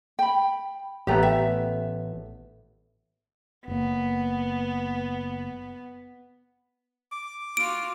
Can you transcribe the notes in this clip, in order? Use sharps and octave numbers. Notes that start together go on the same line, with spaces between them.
G5 B5
A1 A3 B3 G4 A#5
E5
F#1 A#3 B3
D6
F4 F#4 D7